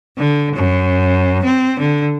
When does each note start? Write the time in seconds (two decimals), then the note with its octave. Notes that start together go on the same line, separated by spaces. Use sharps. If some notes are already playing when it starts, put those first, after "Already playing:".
0.18 D3
0.55 F#2
1.44 C4
1.79 D3